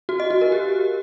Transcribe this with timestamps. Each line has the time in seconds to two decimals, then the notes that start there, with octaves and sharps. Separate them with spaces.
0.09 F#4
0.20 D#5
0.30 F#4
0.41 A#4
0.52 G4